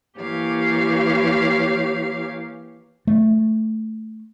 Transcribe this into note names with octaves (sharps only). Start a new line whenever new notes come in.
E3 A#3 G4 C#5 F5
A3